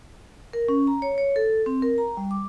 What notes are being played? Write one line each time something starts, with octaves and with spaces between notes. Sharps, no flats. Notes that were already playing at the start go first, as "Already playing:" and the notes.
A#4
C#4
A#5
C#5
C#5
A4
C4
A#4
A#5
G3
D6